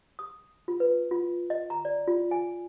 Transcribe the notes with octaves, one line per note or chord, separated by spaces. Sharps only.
D#6
F4
B4
F4
D#5
A#5
D5
F4
G#5